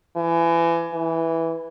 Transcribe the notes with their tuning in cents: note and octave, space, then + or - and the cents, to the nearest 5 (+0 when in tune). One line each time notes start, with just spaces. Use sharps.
E3 +30
E3 -5